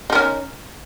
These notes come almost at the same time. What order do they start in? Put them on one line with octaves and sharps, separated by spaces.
D#4 A#4 C#4